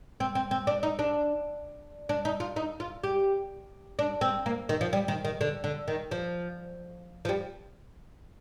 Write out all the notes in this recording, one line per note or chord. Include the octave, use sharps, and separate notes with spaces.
C4
C4
C4
D4
D#4
D4
D4
D#4
F4
D#4
F4
G4
D4
C4
A#3
D#3
F3
G3
D#3
D#3
D3
D3
D#3
F3
F3
G3